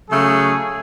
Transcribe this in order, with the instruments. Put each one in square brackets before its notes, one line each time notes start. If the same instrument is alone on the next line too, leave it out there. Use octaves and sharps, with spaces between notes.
[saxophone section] C#3 F#3 A3 [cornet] G#4